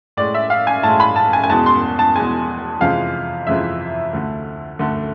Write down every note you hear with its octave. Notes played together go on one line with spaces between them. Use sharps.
A2 G#3 D5
E5
F5
G#5
A2 G#3 A5
B5
A5
G#5
G#5
E2 B2 G#3 A5
C6
A5
E2 B2 G#3 G#5
F2 C3 E3 G#3 F5
F2 C3 E3 G#3 E5
D2 D3 A3
D2 D3 A3